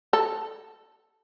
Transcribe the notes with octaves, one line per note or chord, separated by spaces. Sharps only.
A4